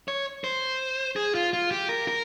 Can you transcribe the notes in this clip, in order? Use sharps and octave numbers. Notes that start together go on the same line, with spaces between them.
C#5
C5
G#4
F4
F4
G4
A#4
A#4